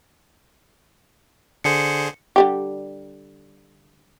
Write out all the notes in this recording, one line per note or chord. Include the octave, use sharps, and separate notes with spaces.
D3 G#4 C5 C#7
D3 G3 G4